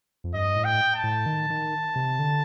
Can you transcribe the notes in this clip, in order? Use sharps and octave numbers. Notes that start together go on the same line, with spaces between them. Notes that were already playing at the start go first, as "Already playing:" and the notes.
F2
G2 D#5
A2
G5
A5
A2
D#3
D#3
C3
D3